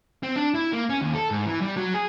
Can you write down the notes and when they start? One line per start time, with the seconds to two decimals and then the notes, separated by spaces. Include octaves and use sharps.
0.23 C4
0.36 D4
0.55 E4
0.73 A#3
0.90 C#4
1.01 D#2
1.15 A4
1.31 G#2
1.46 E3
1.61 G3
1.77 F#3
1.94 G#4